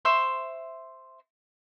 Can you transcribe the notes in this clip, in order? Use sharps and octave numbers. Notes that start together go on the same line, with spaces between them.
C5 E5 C6 C#6